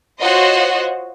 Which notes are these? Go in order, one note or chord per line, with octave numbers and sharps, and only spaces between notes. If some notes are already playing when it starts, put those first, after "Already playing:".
F4 F#4 C5 C#5 D#5 F#5